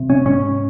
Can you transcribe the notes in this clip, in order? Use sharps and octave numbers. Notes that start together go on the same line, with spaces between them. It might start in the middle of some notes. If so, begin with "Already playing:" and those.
Already playing: C3
C#4
G#2 C#4